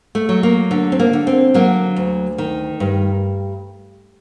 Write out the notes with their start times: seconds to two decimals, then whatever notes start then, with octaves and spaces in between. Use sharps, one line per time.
0.15 A3
0.29 F#3
0.43 A#3
0.71 D3
0.92 C4
1.00 A#3
1.13 D3
1.27 C4
1.54 F#3 A#3
1.96 D2
2.38 D#3
2.80 G2